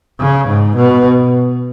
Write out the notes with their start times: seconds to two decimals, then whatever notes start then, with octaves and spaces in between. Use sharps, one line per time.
0.20 C#3
0.48 G#2
0.76 B2